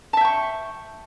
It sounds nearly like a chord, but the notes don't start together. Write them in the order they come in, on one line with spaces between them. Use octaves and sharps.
A5 E5 G5 C#6